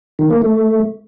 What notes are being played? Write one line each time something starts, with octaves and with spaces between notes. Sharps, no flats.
D#3
A#3
A3